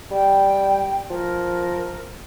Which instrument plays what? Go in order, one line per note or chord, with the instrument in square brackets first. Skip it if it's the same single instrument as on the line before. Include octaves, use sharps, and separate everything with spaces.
[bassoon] G3 [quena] G5
[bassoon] F3 [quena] A#4